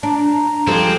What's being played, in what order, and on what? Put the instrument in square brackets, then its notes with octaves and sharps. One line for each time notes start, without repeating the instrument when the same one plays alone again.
[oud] D4 [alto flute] A#5
[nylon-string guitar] F3 A4 [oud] G3 G#3 [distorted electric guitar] C4